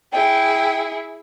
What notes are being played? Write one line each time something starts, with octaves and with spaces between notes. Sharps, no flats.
E4 G#4 G5